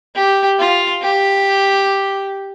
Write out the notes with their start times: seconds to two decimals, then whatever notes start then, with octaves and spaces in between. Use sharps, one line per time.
0.15 G4
0.59 F4
1.02 G4